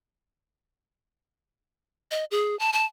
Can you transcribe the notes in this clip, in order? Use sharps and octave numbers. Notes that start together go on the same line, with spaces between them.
D#5
G#4
A5
A5